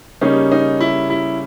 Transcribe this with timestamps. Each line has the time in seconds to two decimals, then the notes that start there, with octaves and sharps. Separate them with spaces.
0.21 C#3 G3 A#3 C#4 D#4
0.52 D#4
0.81 E4
1.10 E4